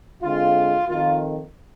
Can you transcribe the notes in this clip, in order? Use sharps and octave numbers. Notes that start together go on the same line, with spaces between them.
D3 G#3 C4 F4
F2 D#3 A#3 F4